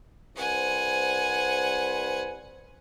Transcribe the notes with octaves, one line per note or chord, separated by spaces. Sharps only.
C2 B4 C5 F#5 G#5